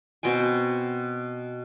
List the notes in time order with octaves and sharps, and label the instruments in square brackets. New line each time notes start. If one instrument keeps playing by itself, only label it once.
[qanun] B2 C4 G5 G#5